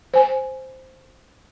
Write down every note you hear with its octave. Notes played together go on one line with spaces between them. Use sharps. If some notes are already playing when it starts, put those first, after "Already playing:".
C5 G#5